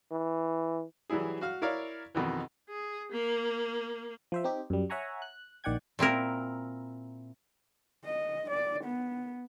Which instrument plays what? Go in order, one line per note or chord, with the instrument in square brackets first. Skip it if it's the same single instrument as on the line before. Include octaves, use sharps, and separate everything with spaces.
[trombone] E3
[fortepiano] E3 F#3 G3 E4 G#4
F#4 F5 F6
E4 A#4 C#5 D5 F5
F2 B2 D#3 E3
[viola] G#4
A#3
[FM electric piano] F3 C5 E5
C4 D#4 G4
F#2 G3
C#5 E5 F#5 G#5 A#5 C#6
F#6
A#1 D#3 D5 F#5 G5 G#6
[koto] A#2 C4 E4 A#4
[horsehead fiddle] D#5
D5
B3